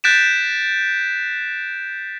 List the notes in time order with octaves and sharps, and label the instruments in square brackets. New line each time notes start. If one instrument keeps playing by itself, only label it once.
[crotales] F#6 G6 A6 B6 D7 E7